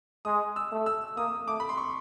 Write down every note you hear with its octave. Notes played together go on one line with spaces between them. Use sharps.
G#3 D#6
E6
A3
E6
A#3 D#6
A3 D6
B5
C6
C#6